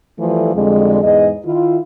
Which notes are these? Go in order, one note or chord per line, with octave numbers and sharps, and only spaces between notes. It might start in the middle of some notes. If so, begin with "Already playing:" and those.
E3 F3 G3 A3
F2 D3 G3 G#3
E2 G#2 G#4 D#5
D#3 E4 F4